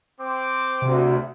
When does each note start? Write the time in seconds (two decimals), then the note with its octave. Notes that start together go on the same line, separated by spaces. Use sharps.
0.20 C4 D6
0.82 D2 C3